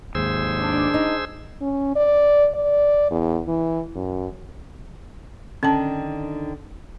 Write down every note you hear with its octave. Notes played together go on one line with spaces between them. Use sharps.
D#2 G#2 G#4 C5 E6
D4
D#4
C#4
D5
D5
E2
E3
F#2
D3 D#3 C#4 A5